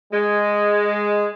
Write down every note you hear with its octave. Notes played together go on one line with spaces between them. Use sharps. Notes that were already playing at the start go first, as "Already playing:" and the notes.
G#3